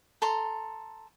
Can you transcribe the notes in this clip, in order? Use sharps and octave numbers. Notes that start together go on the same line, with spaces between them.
A4 A#5 C6